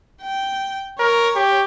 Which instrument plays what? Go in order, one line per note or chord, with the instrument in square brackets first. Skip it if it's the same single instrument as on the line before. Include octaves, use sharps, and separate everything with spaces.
[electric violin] G5
[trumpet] A#4 [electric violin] C#5
[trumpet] G4